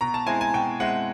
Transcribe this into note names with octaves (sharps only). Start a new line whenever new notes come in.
B2 A#5
A5
G#3 C4 E4 G#5
G#5
B2 G5
G#3 C4 E4 F#5